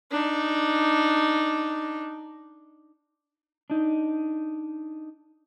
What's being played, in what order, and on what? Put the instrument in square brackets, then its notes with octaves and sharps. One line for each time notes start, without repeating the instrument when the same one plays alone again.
[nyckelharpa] D4 D#4
[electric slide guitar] D4 D#4